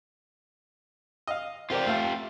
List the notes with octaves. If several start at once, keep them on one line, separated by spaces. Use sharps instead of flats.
D#5 F5
C4 F4 G4 A#4 D5
A3 F5 G5